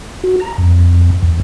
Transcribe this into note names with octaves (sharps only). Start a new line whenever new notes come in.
F#4
A#5
F2
E2